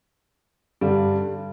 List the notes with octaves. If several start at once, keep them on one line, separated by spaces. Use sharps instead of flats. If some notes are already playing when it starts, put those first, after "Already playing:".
G2 D3 G3